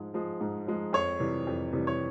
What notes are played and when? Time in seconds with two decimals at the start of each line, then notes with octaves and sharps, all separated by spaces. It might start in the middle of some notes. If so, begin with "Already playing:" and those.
Already playing: G#2 F3 G#3
0.14 F3 G#3
0.41 G#2
0.67 F3 G#3
0.93 F2 C#5
1.20 C3 E3 G3
1.47 F2
1.73 C3 E3 G3
1.87 C#5